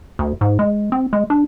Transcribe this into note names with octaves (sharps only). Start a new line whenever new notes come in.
D2
G#2
G#3
C4
G#3
D4